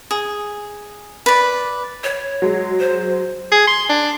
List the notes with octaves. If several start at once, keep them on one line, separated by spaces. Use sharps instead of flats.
G#4
B4 D5
C#5
F#3 G#3
C5
G#4
C6
D4